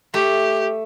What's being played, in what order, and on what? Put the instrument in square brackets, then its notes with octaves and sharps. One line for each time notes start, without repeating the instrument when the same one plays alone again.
[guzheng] A3 [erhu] G4